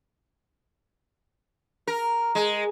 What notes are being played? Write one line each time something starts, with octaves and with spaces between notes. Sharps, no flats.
A#4
G#3